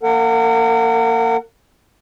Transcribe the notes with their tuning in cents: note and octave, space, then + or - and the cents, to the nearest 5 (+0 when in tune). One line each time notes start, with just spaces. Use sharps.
A#3 -10 A#4 -40 F#5 +0